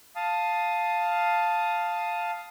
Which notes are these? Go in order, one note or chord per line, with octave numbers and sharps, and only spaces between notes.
F5 A5 D#6